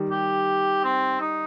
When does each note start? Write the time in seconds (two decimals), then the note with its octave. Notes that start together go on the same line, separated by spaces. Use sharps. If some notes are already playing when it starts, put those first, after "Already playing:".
Already playing: D#3 G3
0.11 G4
0.84 C4
1.21 D#4